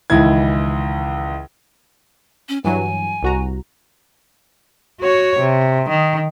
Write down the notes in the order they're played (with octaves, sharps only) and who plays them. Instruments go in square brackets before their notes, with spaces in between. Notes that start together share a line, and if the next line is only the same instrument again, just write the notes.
[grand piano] C#2 D#3 E3 E4 G#6
[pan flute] C#4
[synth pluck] G2 E3 F#3 [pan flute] G#5
[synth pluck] C2 F#4 A#5
[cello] F#4 C#5
C3
D#3